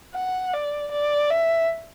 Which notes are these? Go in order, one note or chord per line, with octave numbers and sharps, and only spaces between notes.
F#5
D5
D5
E5